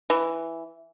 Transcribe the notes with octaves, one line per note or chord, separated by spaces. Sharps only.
E3